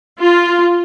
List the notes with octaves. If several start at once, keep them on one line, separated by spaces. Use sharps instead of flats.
F4